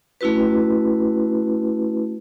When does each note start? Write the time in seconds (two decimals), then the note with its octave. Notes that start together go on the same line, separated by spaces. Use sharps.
0.21 A3 C#4 E4 F#4 B4